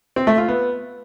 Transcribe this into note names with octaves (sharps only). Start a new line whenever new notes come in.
C4
A3
F4
B3